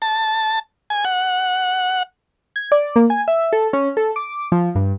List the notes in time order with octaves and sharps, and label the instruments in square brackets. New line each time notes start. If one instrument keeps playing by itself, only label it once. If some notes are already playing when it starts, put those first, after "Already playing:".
[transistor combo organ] A5
G#5
F#5
[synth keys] G#6
D5
A#3
G#5
E5
A4
C#4
A4
D6
F3
G2